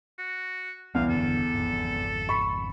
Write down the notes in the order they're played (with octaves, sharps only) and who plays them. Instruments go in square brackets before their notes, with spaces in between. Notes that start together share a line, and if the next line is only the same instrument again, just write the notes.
[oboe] F#4
[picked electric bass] B1 B2 G3 [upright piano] E2 [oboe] F5
[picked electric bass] F#1 D3 [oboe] A4
[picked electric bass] G#1 F2
[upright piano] B5 C#6